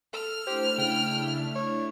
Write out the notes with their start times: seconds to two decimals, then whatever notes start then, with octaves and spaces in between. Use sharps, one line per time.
0.14 A4 F6
0.47 A3 D4 E4 G4 C5
0.78 C#3 G5
1.55 C#5